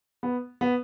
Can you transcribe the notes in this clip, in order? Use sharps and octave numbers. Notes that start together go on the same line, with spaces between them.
B3
B3